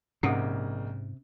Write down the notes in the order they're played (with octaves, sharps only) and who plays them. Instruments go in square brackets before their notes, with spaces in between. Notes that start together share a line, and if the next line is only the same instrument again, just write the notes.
[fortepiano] A#1 A#3 D#4 [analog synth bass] G#2 [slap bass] C3 [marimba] C#4 F#5 D#6